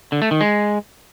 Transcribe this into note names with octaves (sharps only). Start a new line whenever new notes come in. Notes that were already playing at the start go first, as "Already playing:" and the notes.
D3
A3
D#3
G#3